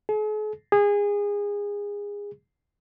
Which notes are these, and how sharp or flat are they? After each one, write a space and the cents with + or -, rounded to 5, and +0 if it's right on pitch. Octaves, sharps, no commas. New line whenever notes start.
G#4 +45
G#4 -25